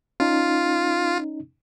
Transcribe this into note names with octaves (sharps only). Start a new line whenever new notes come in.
C#4 D#4 F4